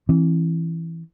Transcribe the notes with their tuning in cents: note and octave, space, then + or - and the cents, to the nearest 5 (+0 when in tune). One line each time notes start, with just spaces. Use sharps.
E3 +0 C4 +45